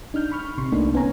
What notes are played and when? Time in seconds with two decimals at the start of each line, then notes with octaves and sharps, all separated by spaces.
0.14 D4 D#4 F6 G6
0.32 B5 C#6 F6
0.58 A1 C3 C6 C#6
0.72 C2 A3 A#3 D4 D#4
0.94 B3 C#4 C#5 G#5 A#5